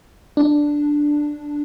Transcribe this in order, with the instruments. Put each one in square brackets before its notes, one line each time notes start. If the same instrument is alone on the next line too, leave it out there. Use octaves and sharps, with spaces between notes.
[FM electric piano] D4